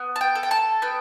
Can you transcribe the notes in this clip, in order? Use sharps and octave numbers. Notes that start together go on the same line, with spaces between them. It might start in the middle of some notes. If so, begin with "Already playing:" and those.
Already playing: B3
A5
G5
A4
G5
A5
B3 G5